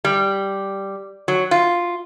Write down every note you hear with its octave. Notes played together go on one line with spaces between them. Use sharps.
G3
F#3
F4